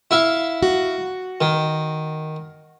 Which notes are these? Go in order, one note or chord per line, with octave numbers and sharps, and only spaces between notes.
E4 E5 F5
F#4
D#3